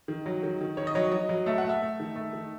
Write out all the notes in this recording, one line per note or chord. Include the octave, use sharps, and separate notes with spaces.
D#3
F#3
D#3
D#3
D#3 C#5
D#5
F#3 C#5
F#3 D#5
F#3
A3 E5
F#5
A3
E5
A3
D#3
A3
D#3